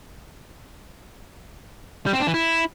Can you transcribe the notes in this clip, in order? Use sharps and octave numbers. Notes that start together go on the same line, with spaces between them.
G3
C4
D4
E3
E4